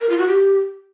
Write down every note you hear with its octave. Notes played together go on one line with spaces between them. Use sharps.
A#4
F4
F#4
G4